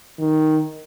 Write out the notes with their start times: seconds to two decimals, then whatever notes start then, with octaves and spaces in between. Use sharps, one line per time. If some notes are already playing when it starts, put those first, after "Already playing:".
0.19 D#3